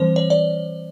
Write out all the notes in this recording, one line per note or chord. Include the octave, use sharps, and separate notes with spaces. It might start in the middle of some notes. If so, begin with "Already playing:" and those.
Already playing: E3 G3 C4 C5
C#5
D5